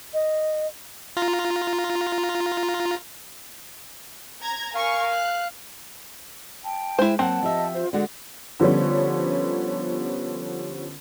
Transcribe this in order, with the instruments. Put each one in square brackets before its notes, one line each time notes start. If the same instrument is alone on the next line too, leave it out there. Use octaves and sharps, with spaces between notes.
[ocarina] D#5
[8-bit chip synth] F4 A#5
[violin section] A#5 G#6
[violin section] A#4 G#5 C#6 [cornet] F5
[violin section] F#6
[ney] G5 [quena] A5
[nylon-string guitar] G#3 [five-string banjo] E4 C5
[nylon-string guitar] F#3 A#3 F#5 [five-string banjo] C4 [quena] A5
[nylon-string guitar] F3 G4 E5 [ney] D#5
[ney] F4 [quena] C5
[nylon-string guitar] D3 G#3 F#4 [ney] D5 [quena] F#5
[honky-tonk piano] D3 F3 G3 B3 C#4